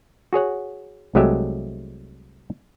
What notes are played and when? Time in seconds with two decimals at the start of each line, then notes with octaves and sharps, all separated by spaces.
0.33 F#4 G#4 C#5 F#5
1.15 C2 F#3 G#3 A3 G4 E5